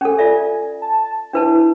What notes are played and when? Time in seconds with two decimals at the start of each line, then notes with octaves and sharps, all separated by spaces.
0.01 C#4 A4 G#5
0.19 F4 D5 E5
0.81 A5
1.33 D4 E4 B4 A5